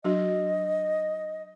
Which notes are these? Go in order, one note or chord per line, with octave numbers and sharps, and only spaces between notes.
F#3 D4 F#4 D#5